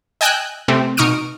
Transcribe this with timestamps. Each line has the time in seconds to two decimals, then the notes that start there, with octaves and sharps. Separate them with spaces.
0.21 D#5 G5 G#5 E6 F#6 G6
0.68 C3 A3 C4
0.97 B2 D#4 C#6 D#6 F6 D7